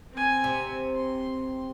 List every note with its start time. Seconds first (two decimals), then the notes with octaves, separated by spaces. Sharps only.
0.12 C4 G#5
0.44 C3
0.95 C6